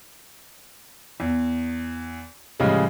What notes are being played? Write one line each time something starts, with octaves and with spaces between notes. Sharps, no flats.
E2
A2 C#3 F3 G3 G#3